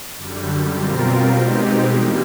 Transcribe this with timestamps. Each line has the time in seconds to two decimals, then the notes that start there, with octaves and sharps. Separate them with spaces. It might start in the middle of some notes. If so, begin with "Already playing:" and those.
0.17 F#2 D3 G3
0.75 B2 G3 C4 F4 A#4
1.32 B2 G#3 C4 D#4 G4
1.89 E3 G3 A#3